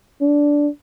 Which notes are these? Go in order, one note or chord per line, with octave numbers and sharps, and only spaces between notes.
D4